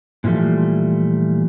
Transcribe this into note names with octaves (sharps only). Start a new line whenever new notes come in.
A#2 E3 F3 G3 A3